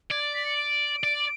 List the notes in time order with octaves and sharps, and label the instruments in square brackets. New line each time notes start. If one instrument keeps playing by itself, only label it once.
[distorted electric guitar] D5 [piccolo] G#6
[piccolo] A6
B6
C#7
D7
[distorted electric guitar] D5